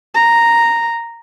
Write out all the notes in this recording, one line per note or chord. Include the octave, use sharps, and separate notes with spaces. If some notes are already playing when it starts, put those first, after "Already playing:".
A#5